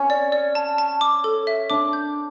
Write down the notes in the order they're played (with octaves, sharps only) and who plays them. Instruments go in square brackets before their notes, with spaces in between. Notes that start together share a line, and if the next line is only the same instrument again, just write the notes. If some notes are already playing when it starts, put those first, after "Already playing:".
Already playing: [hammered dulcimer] C#4
[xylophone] D5
D5
A5
A5
D6
A4
E5
[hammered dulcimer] D4 [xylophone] D6
[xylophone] G6